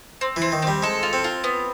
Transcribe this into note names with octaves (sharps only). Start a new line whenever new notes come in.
C4
E3
C4
D#3
C4
G3
G#3 A4
F4
C4
F4
B3